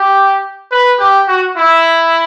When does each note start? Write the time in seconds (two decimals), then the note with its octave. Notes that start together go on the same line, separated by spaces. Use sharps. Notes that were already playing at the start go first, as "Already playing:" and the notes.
Already playing: G4
0.72 B4
0.99 G4
1.28 F#4
1.57 E4